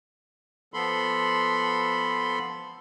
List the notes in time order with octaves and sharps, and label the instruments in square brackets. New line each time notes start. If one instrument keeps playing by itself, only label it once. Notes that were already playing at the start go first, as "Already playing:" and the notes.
[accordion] F3 B3 A4 B5 C6